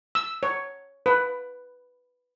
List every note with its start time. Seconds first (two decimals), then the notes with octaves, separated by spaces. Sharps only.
0.15 E6
0.43 C#5
1.06 B4